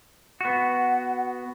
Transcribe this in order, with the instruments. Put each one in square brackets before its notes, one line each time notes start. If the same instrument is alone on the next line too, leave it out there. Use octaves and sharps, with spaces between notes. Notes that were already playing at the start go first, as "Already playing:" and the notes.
[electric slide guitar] B3 F#4 [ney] F#5